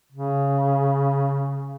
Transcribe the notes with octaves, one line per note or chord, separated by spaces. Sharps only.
C#3